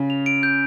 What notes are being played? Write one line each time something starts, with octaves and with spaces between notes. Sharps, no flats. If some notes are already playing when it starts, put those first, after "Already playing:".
Already playing: C#3
F7
D7
G6